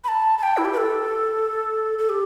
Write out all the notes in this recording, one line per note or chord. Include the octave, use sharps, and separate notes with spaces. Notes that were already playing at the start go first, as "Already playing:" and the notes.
B5
A5
A5
G5
E4
G4
B4
A4
A4
G4